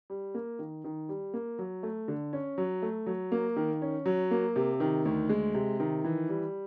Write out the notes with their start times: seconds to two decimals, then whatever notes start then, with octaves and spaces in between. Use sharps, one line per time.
0.10 G3
0.35 A#3
0.59 D#3
0.84 D#3
1.09 G3
1.34 A#3
1.59 F#3
1.83 A3
2.08 D3
2.33 C#4
2.58 F#3
2.82 A3
3.06 F#3
3.32 A#3
3.56 D#3
3.82 C#4
4.06 F#3
4.31 A#3
4.56 C3
4.80 D#3
5.05 D2
5.29 G#3
5.54 C3
5.80 D#3
6.04 E3
6.29 G3